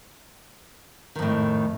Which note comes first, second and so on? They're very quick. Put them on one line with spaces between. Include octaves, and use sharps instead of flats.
D#3 F2 A2